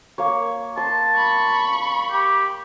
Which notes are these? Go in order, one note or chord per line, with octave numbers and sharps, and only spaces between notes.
A#3 C#5
A5 C6
B5 C#6
G4